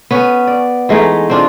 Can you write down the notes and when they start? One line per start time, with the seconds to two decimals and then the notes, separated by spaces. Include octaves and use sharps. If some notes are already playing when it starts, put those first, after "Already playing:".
0.11 B3 C#4 B4
0.47 D5
0.89 E3 G#3 A3 D#4
1.30 C4 D4 F4